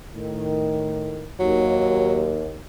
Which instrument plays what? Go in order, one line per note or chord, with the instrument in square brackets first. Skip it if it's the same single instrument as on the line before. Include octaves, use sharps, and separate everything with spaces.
[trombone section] A2 D#3
[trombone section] D#2 [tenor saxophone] F#3